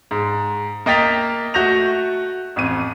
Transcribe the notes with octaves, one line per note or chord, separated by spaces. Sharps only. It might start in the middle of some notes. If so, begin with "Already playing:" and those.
G#2
A#3 D#5 G5 A6 B6 F7
A3 F#4 G6 A#6 F7
A1 F2 D#7